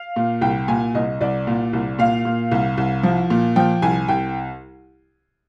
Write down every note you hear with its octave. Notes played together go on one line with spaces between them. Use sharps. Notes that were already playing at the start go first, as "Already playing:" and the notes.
Already playing: F5
A#2
C2 G5
A#2 G#5
C2 D#5
C2 D5
A#2
C2
A#2 F5
A#2
C2
C2
F3
A#2
F3 G5
C2 G#5
C2 G5